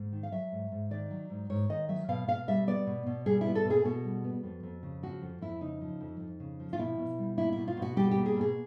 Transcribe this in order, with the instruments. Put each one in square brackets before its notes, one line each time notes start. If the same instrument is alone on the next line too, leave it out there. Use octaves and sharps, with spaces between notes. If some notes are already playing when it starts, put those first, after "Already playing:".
Already playing: [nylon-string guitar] G#2
D#3
F5
F#3 E5
G#2
G#2
D#3 D5
F#3
G#2
G#2 C#5
D#3 D#5
F#3 E5
B2 F5
B2 F5
G3 E5
B3 D5
B2
B2
G3 G#4
B3 E4
A4
B2
G#4
B2 F#4
G3
B3
F2
F2
C#3
F3 F#4
F2
F2 E4
C#3 D#4
F3
F2
F2
C#3
F3
F4
B2 E4
B2
G3
A#3 E4
B2 E4
F4
B2
F#4
G3 G4
G4
A#3
G#4
B2 G#4